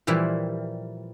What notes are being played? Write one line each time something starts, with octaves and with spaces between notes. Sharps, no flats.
A#2 E3 F3 G3 E4